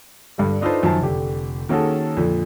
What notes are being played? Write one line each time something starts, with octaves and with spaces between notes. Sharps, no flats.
G2 D3 G3
D4 D#4 F4 A4 B4 C5
F#2 D#3 F3 C5 A5
F1 D3 G4
D#3 A#3 C#4 F#4 G#4 A4
F2 A#2 D3